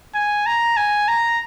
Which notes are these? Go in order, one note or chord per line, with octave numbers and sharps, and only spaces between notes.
G#5
A#5
G#5
A#5